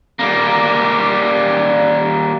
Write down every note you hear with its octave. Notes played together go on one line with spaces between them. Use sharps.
G3 A#3